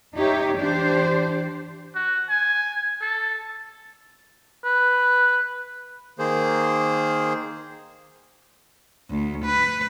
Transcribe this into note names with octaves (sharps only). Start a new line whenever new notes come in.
D#4 G4 C#5 E5
E3 D4 G4 C5
F#4
G#5
A4
B4
D#3 A#3 G#4 C5
D2
B4